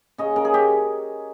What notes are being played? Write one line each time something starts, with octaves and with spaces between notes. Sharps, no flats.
C#3 D#5
C#3 A#4
G#4
C#3 G4